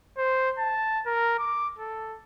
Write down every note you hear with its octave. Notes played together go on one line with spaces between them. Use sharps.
C5
A5
A#4
D6
A4